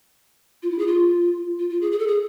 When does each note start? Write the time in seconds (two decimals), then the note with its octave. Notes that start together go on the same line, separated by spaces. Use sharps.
0.63 F4
0.71 E4
0.79 G#4
0.87 F4
1.59 F4
1.70 F4
1.81 G#4
1.92 G#4
1.99 A4
2.07 G#4